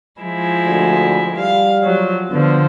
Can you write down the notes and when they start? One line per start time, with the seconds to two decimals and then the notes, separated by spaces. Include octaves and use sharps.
0.21 F3 G#3 E4
0.66 D2
1.36 G3 F5
1.83 F3 F#3
2.31 D3 F3 B3